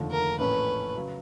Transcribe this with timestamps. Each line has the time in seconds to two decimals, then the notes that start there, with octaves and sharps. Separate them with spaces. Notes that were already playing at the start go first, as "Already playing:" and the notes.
Already playing: F1 D#2 D3 F3 A3
0.11 A#4
0.39 A#1 A2 E3 A3 C#4 B4
0.95 C#3 F#3